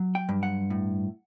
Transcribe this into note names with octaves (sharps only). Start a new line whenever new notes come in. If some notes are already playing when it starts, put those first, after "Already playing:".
Already playing: F#3
G5
G2
F#5
A2